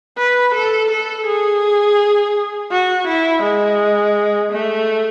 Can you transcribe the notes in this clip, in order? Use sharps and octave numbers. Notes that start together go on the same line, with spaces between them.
B4
A4
A4
G#4
F#4
E4
G#3
A3